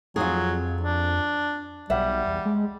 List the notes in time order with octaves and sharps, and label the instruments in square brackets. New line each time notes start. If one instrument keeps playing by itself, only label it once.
[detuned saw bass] F2 [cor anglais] F#3 [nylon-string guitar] F4 G#4
[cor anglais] D4
[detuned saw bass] B1 [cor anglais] G3 [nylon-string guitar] E5 F#5
[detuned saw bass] E2
G#3